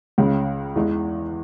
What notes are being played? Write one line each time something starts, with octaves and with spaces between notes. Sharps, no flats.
C#2 C#3 G#3
E2 E3 G#3